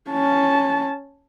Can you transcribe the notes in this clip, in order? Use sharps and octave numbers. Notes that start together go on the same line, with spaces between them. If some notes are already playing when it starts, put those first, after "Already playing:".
C#4 A5